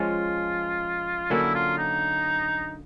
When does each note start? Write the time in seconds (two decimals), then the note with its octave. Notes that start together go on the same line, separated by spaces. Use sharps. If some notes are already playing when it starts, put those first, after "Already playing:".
Already playing: F3 G#3 C#4 F4
1.30 D3 F#3 A#3 C#4 E4
1.55 F4
1.78 D#4